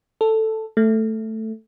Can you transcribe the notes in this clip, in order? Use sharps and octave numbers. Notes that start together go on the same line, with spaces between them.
A4
A3